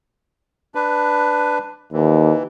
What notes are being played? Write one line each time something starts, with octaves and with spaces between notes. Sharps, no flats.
D4 B4
D#2 E3